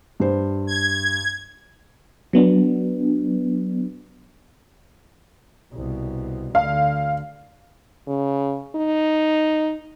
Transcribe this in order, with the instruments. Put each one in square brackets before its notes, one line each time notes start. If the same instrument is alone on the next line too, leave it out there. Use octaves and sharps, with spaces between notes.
[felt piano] G2 C5
[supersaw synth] G#6
[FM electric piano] F#3 B3 D4
[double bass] C2 B2
[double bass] D2 D3 [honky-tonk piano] F5
[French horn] C#3
D#4